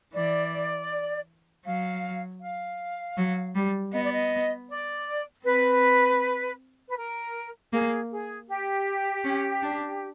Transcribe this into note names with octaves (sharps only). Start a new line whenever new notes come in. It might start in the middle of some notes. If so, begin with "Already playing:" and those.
E3 D5
F#3 F5
F5
F#3
G3
B3 D#5
D5
D#5
D5
C4 B4
B4
A#4
A#3 G#4
G#4
G4
C#4
D4